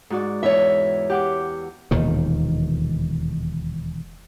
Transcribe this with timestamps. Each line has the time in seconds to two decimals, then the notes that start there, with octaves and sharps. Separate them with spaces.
0.10 G#2 F#4 D5
0.43 E2 C#5 E5
1.10 G4 F#5 D6
1.91 E1 D#2 A#2 D#3